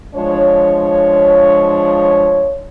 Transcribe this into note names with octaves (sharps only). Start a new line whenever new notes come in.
F3 G#3 D4 C#5